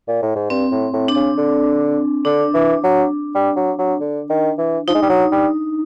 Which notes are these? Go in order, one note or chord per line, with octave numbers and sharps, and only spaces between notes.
A#2
A2
G#2
G2 C4
A2
A2
D4
C#3
D3
D3 D4
E3
F#3
G3
F#3
F#3
D3
D#3
E3
F3 D#4
G#3
G3
F#3
G3